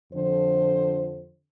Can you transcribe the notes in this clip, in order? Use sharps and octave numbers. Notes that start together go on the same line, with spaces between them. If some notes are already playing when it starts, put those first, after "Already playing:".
F2 D3 F3 C5